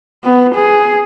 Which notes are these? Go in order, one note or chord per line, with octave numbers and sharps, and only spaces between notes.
B3
G#4